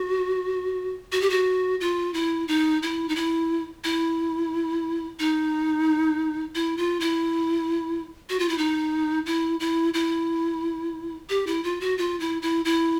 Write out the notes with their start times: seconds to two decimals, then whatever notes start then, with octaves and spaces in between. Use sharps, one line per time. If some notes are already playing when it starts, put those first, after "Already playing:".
Already playing: F#4
1.12 F#4
1.21 G4
1.30 F#4
1.81 F4
2.14 E4
2.48 D#4
2.83 E4
3.09 D#4
3.16 E4
3.84 E4
5.19 D#4
6.55 E4
6.78 F4
7.00 E4
8.30 F#4
8.39 F4
8.49 E4
8.58 D#4
9.26 E4
9.60 E4
9.94 E4
11.30 G4
11.47 E4
11.64 F4
11.81 F#4
11.98 F4
12.20 E4
12.42 E4
12.65 E4